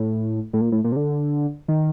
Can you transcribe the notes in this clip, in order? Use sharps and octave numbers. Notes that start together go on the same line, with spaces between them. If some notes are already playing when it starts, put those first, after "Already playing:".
Already playing: A2
A2
A#2
A2
A#2
C3
D3
D#3